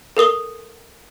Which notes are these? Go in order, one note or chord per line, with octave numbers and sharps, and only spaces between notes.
A4 A#4 D#6 G7